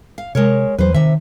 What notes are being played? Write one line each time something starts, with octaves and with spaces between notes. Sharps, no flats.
F5
C3 G#3 A#4 C#5
E2 F#3 B4 C5
C3 D#3 E5